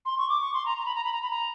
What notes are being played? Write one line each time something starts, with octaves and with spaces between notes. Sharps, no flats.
C6
C#6
D6
C#6
C6
A#5
A#5
B5
A#5
B5
A#5
B5
A#5